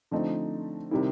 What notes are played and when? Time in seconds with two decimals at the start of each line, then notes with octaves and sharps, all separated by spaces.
0.11 D3 F3 A3 C4 D#4
0.91 C3 D#3 G3 C4 E4